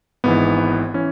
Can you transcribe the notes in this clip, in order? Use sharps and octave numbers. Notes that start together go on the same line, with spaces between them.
G#1 G#2 E3 B3
E3 C#4